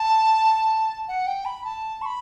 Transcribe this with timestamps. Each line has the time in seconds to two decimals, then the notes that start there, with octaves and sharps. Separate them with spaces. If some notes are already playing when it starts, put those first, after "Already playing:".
Already playing: A5
1.08 F#5
1.27 G5
1.45 B5
1.65 A5
2.02 C#6
2.06 B5